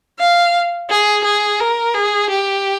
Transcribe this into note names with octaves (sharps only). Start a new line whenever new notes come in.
F5
G#4
G#4
A#4
G#4
G4